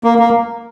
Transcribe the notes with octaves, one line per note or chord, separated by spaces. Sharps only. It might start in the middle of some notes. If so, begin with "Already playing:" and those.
A#3
A#3